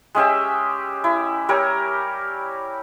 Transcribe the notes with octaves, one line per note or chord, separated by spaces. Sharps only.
G#3 C#4 G4 E5
E4
G3 G4 A#4 C#5